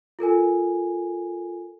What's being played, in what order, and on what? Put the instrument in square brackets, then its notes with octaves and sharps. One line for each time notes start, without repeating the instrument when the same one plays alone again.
[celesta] F4 A4 A#4 G#5